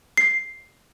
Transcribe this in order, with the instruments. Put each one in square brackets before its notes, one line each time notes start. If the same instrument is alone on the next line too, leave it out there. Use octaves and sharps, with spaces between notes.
[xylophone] C7